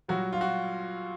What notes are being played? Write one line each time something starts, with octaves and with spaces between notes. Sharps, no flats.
A#2 F#3 G3 F#4
F4
F#4